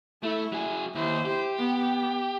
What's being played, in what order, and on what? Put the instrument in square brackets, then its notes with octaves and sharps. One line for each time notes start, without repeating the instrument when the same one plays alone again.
[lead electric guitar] A3 [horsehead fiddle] E4
[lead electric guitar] F#3 G#4
[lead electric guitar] D#2 [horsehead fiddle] E4 C5
[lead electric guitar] G4
[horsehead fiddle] B3